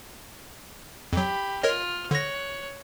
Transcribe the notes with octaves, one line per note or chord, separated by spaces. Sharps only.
F2 F#3 G4 B5
F4 A#4 C#5 D#5 F6
D3 C#5 F#6 A#6